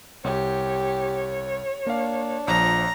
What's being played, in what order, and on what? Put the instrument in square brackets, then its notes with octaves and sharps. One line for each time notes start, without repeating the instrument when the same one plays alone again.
[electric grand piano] C2 [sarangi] G4 [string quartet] C#5
[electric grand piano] A#3 F5 [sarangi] D4
[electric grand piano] A#1 F3 [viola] A#5